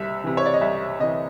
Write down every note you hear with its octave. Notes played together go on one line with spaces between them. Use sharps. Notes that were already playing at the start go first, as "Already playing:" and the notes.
Already playing: C2 C3 E5
C3 E3
C#5
D5
D#5
C2 E5
C3 E3 D#5